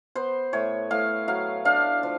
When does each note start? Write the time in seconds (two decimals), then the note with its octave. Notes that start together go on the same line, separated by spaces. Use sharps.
0.15 B3 C5
0.53 A2 C#5
0.91 A2 F5
1.28 F#3 F5
1.65 D4 F5
2.03 F3